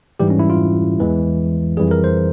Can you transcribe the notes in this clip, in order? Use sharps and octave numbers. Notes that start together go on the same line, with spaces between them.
G#2 E3 G3 G4
C#4
E4
F4
E2 E3 G#3
F2 E3 G3 G#4
A#4
C5